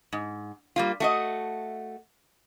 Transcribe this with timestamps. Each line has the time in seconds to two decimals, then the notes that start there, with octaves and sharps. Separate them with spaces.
0.13 G#2
0.76 G3 A#3 F4
1.00 A3 F#4 D#5